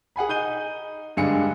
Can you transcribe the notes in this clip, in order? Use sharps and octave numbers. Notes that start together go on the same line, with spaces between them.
G#4 F#5 G#5 B5
D#4 G6 D#7 G7
G2 D3 G#3 F5 G#5 C#7